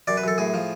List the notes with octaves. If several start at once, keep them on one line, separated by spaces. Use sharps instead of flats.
F#2 D5
B4
F#2 A4
A2 G#4
F3